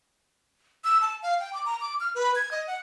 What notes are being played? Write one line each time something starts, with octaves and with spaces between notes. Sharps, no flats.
E6
A5
F5
G5
D6
A#5
D6
F6
B4
G#6
D#5
F#5